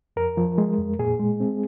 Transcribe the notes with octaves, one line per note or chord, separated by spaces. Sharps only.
F2 A#4
F3
G#3
F2
A#2 G#4
G#3
C4